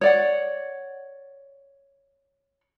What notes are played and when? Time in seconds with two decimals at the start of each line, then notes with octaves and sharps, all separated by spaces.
0.01 C#5 D5 F#5